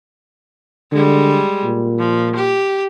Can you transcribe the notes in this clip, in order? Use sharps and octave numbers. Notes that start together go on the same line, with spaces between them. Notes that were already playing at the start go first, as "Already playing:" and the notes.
D3 G3 G#3
A#2
F3
G4